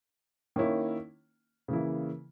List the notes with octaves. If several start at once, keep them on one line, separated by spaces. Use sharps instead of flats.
D#3 A#3 C#4 E4
C#3 E3 A#3 E4